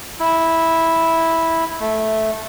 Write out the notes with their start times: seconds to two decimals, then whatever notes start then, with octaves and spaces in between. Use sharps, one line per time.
0.20 E4
1.80 A3